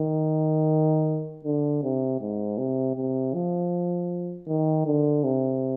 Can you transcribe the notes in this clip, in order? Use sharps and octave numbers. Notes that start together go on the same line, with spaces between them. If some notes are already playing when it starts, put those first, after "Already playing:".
Already playing: D#3
D3
C3
G#2
C3
C3
F3
D#3
D3
C3